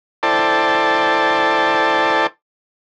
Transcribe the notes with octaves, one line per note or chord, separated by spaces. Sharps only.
E4 A4 C5 D5 G5 A5